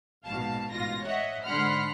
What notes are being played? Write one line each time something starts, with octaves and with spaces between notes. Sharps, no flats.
A#1 G#2 B2 F5 A5
A1 G#2 B2 F4 A#6
C#5 D#5 E5 F#5
G#2 D3 F#5 B5 C6 F6